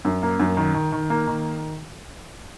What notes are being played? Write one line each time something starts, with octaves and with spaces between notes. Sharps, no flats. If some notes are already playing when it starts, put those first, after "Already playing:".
F#2
A#3
F#2
D#3
D#3
D#3
A#3
D#3